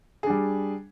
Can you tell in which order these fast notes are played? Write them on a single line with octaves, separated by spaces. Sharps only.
G#4 D4 G3